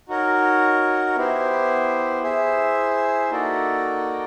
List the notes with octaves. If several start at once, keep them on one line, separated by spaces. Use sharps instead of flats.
D#4 F#4 A#4 C#5
B3 E4 G4 C5
E4 G#4 C5 E5
A#3 D#4 F#4 A4 D5